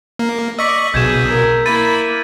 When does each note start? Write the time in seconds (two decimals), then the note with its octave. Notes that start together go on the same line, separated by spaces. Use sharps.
0.19 A#3
0.59 D5 D#5 C#6 E6 B6
0.94 B1 B2 G#4 G6 G#6 E7
1.30 A#4
1.66 A#3 E4 B5 A6 D#7